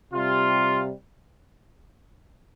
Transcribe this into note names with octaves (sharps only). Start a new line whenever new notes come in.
C3 G3 F4